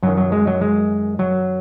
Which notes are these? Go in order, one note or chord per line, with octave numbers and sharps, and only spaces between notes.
F#2 D#3 F#3
F#3
G#3
F#3
G#3
F#3